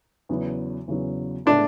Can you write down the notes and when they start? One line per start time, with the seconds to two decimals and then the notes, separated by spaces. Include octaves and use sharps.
0.29 E2 C#3 F#3 B3
0.88 E2 C#3 F#3 B3
1.46 A2 G#3 B3 D4 E4